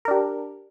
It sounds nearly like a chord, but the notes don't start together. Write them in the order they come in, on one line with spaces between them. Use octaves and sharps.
A#4 D4 G4